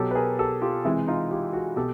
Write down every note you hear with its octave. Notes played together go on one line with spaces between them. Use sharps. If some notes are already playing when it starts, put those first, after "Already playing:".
Already playing: B2 F#3 G4 A4
B4
G#4 A#4
G4 A4
F4 G4
C3 E3 G#3 E4
D#4 F4
F4 G4
F#4 G#4
B2 G4 A4